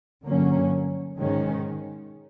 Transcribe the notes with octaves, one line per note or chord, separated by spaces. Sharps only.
G2 D3 F#3 A#3 C#4
G#2 D#3 G#3 C#4